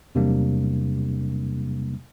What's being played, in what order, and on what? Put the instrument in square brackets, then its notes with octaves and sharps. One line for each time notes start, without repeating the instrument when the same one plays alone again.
[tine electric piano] E2 C3 F#3 G3 A#3 D4